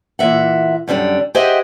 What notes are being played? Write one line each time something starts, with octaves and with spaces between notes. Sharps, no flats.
A#2 E3 E5 F#5
F#2 D3 G3 D4
G4 G#4 C5 D#5 E5 F#5